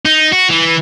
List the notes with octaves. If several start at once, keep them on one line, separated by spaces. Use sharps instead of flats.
D#4
F#4
E3